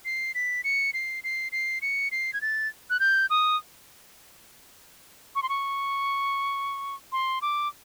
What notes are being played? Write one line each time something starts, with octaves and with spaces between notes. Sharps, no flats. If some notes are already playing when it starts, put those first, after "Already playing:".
C7
B6
C#7
C7
C7
C7
C#7
C7
G#6
A6
F#6
G6
D#6
C#6
C6
C#6
C6
D6